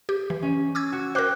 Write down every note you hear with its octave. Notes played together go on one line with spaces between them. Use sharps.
G4
E3
C#4
D6 E6 G#6
F#4
A#4 C5 G5 D6 F#6